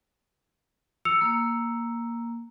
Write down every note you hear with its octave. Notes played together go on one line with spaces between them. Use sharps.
E6 C#7 F7
A#3